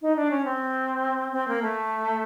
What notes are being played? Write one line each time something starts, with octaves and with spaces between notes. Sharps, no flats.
D#4
D4
C#4
C4
C4
A#3
A3